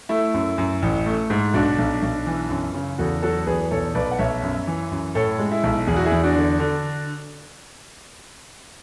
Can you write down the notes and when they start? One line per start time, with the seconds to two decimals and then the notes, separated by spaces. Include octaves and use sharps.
0.09 A3 E4
0.34 F#2
0.58 F#2
0.82 A1
1.06 A3
1.30 G#2
1.54 B1 D4 F#4
1.78 B1
2.02 B1
2.26 E3
2.50 F#2
2.74 C#3
2.98 E2 F#4 A4
3.22 F#3 F#4 A4
3.46 E2 G#4 B4
3.71 B1 A4 C#5
3.95 B1 B4 D5
4.11 F#5
4.19 B1 C#5 E5
4.43 F#2
4.67 E3
4.91 F#2
5.15 A2 A4 C#5
5.39 G#3
5.51 E4
5.64 B1
5.87 E2 G#4
5.96 F#4
6.05 E4 G#4
6.11 E2
6.23 D4 F#4
6.36 D3
6.59 D3